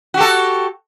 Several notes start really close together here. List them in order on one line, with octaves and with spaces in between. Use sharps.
F#4 G4 A4